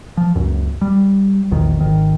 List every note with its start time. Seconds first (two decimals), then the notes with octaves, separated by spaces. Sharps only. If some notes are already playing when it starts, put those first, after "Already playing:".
0.17 F3
0.35 C#2 F#2
0.81 G3
1.51 A#1 E2 D#3
1.79 G#1 D#3